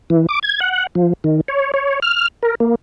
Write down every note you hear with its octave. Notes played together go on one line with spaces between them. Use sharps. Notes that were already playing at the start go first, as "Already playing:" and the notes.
E3
D6
G#6
F#5
F3
D#3
C#5
C#5
F6
A#4
A#3